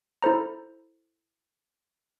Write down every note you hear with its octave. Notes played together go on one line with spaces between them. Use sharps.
E4 A4 C5 A#5